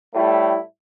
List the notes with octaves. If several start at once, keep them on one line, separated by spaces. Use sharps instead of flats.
A2 G3 A3 E4